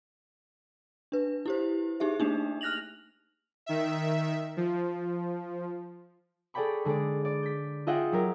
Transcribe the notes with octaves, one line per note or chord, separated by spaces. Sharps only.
D4 B4
E4 G4 C5
D#4 G4 G#4 E5
A3 A#3 D4 D#4
F6 F#6 A#6 F7 F#7
D#3 E5
F3
G#4 A4 D5 G5 B5 C#6
D3 G#3 G#4 D5
D5
G6 B6
F4 G#4 D#5 E5 F#5 G5
F#3 G4 A#4